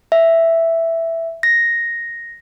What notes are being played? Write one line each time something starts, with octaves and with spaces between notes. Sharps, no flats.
E5
A#6